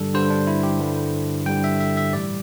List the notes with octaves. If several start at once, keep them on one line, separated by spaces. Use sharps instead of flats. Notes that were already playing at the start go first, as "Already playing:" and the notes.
Already playing: G2 D3 G3 A4
G2 D3 G3 C5
D4
E4
G4
G2 D3 G3
G2 D3 G3 G5
E5
E5
E5
A2 E3 G3 D5